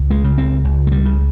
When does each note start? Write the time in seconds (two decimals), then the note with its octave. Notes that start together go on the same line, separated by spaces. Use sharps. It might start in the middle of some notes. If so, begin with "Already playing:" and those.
Already playing: C#2
0.11 G#3
0.24 C#3
0.38 C4
0.65 C#2
0.87 G#3
0.92 G3
1.05 C#3